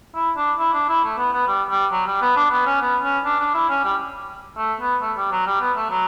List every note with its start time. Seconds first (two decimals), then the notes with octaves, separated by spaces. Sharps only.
0.15 E4
0.37 D4
0.59 E4
0.74 D4
0.89 E4
1.04 A3
1.18 B3
1.33 B3
1.48 G3
1.70 G3
1.92 F#3
2.07 G3
2.22 B3
2.37 D4
2.51 B3
2.66 C#4
2.81 B3
3.03 C#4
3.25 D4
3.40 D4
3.55 E4
3.69 C#4
3.84 G3
4.58 A3
4.80 B3
5.02 A3
5.18 G3
5.32 F#3
5.47 G3
5.61 B3
5.76 A3
5.90 F#3